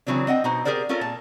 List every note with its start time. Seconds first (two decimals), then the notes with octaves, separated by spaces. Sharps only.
0.07 C#3 E3 F#3 C4 D4
0.27 C4 D#5 F#5 G5
0.44 B2 D#4 C5
0.65 G4 G#4 A#4 C5 D5
0.89 C#4 F4 A4 A#4
1.01 A#2 A5